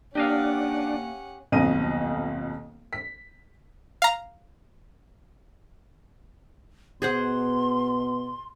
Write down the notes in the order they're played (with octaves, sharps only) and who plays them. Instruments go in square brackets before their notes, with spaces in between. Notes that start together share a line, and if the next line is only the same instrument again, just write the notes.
[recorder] A#3 [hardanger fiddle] C#4 F#5 [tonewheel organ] D4 [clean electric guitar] G4 D#5 F5
[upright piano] D#1 B1 F2 B2 D#5 D#7
B6
[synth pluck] F5 A#5
[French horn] B2 [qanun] G#4 C5 F#5 [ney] C6